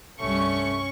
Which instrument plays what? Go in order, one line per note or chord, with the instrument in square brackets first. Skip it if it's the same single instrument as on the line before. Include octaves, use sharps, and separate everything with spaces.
[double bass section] C2 G2 G3 [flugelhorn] A3 [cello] C#4 [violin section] C#6